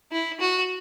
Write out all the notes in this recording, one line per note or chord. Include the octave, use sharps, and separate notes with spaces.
E4
F#4